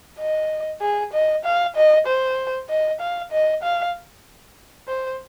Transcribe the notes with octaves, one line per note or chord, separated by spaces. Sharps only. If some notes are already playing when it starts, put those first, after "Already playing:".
D#5
G#4
D#5
F5
D#5
C5
D#5
F5
D#5
F5
C5